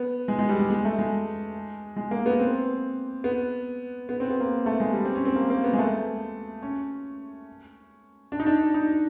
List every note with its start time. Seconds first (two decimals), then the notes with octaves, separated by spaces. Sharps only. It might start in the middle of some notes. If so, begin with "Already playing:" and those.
Already playing: B3
0.28 G#3
0.39 G#3
0.49 G3
0.59 G#3
0.70 G#3
0.85 A3
0.98 G#3
1.96 G#3
2.11 A#3
2.26 B3
2.39 C4
3.24 B3
4.09 B3
4.20 C4
4.30 B3
4.40 A#3
4.66 A3
4.80 G#3
4.93 G3
5.05 C4
5.15 C#4
5.25 C4
5.36 A#3
5.50 A#3
5.64 B3
5.73 G#3
5.79 A3
6.62 C#4
8.32 D4
8.40 D#4
8.46 D4
8.74 D#4